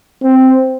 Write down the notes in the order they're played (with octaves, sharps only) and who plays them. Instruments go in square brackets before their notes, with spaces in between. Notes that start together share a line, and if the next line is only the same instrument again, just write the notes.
[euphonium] C4